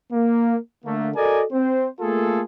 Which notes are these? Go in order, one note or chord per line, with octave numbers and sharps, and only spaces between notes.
A#3
D3 A3 A#3
F#4 A4 A#4 D5 D#5 G#5
C4 C5
A3 A#3 F4 G#4 A4